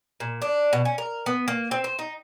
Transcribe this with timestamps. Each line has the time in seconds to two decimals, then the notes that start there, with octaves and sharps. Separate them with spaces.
0.20 A#2
0.42 D4
0.73 B2
0.85 C#4
0.98 A#4
1.26 B3
1.48 A#3
1.71 C4
1.84 C5
1.99 D#4